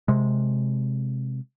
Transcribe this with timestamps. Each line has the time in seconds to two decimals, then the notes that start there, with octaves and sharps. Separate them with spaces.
0.08 C3 G#3